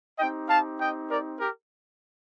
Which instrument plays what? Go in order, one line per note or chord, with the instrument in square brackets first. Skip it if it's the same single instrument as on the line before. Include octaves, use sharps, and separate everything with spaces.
[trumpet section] C4 D#4 G4 D#5 G5
F5 A5
D#5 G5
A#4 D5
G4 A#4